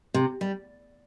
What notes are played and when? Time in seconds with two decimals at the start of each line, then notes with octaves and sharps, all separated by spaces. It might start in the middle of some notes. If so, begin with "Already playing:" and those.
0.14 C3
0.41 G3